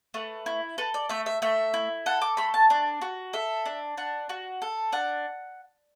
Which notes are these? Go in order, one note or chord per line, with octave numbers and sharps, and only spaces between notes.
A3 B4
E4
A4 B4
D5
A3 E5
E5
A3 E5
E4
A4 F#5
D6
A3 B5
A5
D4
F#4
A4 E5
D4
D4 F#5
F#4
A4
D4 F#5